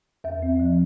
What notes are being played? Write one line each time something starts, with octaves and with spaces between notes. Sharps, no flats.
E2 E5
C4
F3